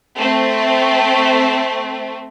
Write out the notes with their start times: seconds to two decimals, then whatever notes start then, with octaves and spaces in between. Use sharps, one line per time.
0.18 A3 C4